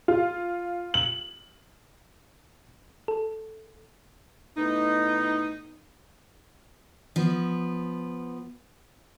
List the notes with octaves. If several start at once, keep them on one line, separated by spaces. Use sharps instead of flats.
F4
F#7
A4
A2 B3 D#4
F3 B3